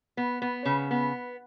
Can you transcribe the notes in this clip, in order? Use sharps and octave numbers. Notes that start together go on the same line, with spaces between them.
B3
B3
C#3
B3